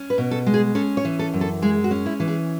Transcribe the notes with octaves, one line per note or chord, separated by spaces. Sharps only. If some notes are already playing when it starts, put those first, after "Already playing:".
Already playing: C#4
B4
B2
A4
G#3
G#4
C#4 A4
C#5
E3
A4
F#2
A4
G#3 G#4
F#4
C#4
E4
E3
G#4